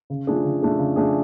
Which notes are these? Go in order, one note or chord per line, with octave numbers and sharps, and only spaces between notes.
C#3
F3 A3 D4 G#4
C#3
F3 A3 D4 G#4
C#3
F3 A3 D4 G#4